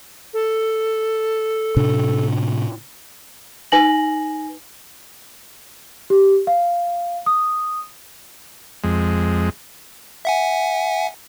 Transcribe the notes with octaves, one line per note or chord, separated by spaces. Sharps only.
A4
A2 C3 D4
D#4 B4 G#5 A#6 F#7
G4
F5
D#6
F2 G#3
E5 F#5 G#5